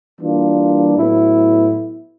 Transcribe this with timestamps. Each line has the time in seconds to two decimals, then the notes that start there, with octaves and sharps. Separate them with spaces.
0.19 E3 G3 A#3 D4 F4
0.97 A2 F#3 B3 E4